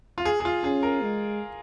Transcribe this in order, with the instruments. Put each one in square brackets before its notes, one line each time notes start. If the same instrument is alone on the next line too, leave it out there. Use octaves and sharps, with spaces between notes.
[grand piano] F4
G#4
G#4
F4
[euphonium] C#4 [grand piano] G#4
[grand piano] A#4
[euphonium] G#3